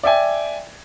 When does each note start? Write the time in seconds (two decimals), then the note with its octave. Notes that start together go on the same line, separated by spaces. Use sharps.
0.03 D5 E5 G5 G#5